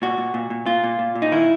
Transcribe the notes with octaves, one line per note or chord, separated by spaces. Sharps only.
A#2 F#4
A#2
A#2
A#2
A#2 F4
A#2
A#2
A#2
D#4
D#3 E4